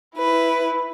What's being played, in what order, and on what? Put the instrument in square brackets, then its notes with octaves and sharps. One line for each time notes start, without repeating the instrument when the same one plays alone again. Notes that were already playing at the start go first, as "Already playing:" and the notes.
[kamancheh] E4 [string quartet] B4